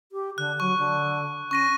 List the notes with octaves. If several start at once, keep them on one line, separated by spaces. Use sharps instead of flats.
G4
D3 F#6
F#3 C#6
D3
C#4 C#6 A#6 D#7